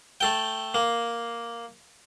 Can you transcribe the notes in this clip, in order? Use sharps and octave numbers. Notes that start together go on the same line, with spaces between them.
A3 A4 G5
A#3